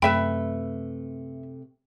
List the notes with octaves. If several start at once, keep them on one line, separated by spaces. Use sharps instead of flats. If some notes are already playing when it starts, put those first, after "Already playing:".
F#2 C3 A3 B4 E5 G5 B5